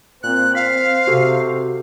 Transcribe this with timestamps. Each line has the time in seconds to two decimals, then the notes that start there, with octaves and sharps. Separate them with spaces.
0.23 A#2 C4 F#6
0.55 C5 F5 B6
1.07 C3 F#4 G4 A4